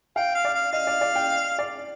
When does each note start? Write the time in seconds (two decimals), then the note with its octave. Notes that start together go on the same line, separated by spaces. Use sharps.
0.16 F5 G5
0.35 F5
0.45 D5
0.54 F5
0.72 D#5 F5
0.87 D5
1.01 D5
1.15 G5
1.59 D5